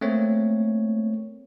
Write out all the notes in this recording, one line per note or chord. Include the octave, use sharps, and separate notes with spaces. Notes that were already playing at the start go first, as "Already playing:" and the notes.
A3 A#3 C4 C#5